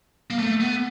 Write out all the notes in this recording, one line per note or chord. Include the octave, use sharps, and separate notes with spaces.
A#3
A3
B3